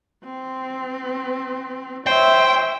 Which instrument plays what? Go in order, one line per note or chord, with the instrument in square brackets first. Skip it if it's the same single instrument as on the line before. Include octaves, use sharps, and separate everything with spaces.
[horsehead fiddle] C4
[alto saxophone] C5 [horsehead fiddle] C#5 E5 [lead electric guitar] G5